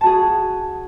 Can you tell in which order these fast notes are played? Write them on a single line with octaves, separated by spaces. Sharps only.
A5 F#4 G#4